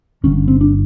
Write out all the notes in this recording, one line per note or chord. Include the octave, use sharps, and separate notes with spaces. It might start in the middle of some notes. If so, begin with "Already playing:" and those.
G1 G2 D3 C#4
C4
D4